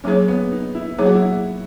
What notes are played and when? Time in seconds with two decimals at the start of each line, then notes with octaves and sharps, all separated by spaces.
0.04 F#3 A#3 C#4 D#4 G#4 C#5
0.28 B3
0.51 D#4
0.75 E4
0.98 F#3 A#3 D#4 G#4 C#5
1.06 F#4
1.14 E4